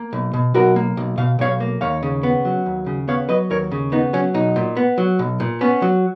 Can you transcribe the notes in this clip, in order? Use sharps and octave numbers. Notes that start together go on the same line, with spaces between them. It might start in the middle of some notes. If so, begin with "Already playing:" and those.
Already playing: A#3
B1
B2
B1 F#4 A#4
A#3
B1
B2 F5
B1 C#5 F5
A#3
D#2 C#5 F5
C#3
B3
F#3
D#2
C#3
B3 C#5 F5
F#3 B4 D#5
D#2 A#4 C#5
C#3
B3 D#4
F#3 C#4
B1 D#4
A#2
B3
F#3
B1
A#2
B3 C#4
F#3